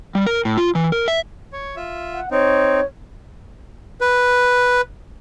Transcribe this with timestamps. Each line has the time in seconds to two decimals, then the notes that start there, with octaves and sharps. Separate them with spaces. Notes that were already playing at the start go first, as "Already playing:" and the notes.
0.15 G3
0.27 A#4
0.45 A2
0.58 F4
0.75 E3
0.92 A#4
1.08 E5
1.53 C#5
1.76 F4 E5
2.14 F#5
2.31 C4 D#4 C#5
4.01 B4